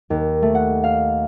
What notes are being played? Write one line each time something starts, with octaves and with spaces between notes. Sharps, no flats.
D#2
A3
F#5
F5